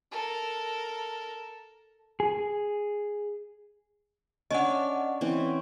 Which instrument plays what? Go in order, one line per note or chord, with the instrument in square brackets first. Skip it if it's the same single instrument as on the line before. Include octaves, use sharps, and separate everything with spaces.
[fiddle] A4 A#4
[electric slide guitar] G#4
[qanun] C#4 D4 [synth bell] D#5 F#5
[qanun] E3 C4 C#4